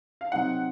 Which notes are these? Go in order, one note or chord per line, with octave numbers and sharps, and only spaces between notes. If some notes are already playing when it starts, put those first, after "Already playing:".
F5
C3 F#3 C4 D#4 F#5